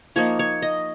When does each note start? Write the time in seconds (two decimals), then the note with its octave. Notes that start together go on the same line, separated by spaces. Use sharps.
0.16 F3 A#3 D#4 C#5
0.39 C#5
0.62 D#5